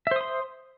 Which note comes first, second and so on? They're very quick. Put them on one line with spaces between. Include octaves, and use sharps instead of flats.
E5 C5 D#6 C6